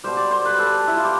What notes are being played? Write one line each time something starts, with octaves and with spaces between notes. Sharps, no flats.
B2 G3 C5
D5
C5
B4
A4
E4
F4
G4